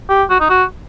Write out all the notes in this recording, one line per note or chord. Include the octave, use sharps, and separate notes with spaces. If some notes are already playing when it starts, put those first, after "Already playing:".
G4
F#4
D#4
F#4